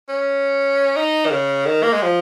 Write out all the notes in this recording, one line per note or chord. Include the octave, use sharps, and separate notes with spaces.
C#4
D#4
D#3
C#3
D#3
A#3
G#3
F3